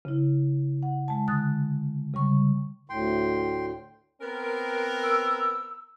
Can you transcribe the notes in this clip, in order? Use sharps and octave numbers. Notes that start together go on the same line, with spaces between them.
C#3 E4
F#5
G#3 A5
D3 D#6 F#6 A6
C#3 G3 C#6
D2 A2 G5 C6
B3 C4 A#4
E6